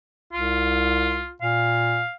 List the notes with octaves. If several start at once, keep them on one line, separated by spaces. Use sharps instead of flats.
C2 F4
A#2 F5